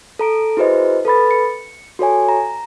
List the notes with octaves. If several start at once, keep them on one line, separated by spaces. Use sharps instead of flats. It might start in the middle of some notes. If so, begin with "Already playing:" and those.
A4 A#5 D7
E4 F#4 G#4 B4 C5 D#5
A4 B4 B5 A6
C#7
F#4 A4 C#5 G#5
A#5